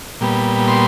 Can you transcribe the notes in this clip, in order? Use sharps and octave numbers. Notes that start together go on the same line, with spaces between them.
A#2 G3 B3
C6